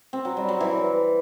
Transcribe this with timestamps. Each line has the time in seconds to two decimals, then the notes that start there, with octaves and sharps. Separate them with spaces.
0.13 C4
0.25 F#3
0.37 G3
0.49 F#3
0.60 E3